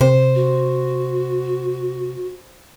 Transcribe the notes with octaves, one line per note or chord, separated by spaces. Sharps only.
C3 C5
F#4